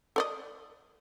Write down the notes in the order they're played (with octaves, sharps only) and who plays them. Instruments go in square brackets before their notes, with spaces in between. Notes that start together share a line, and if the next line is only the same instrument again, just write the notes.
[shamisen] A4 D5 D#5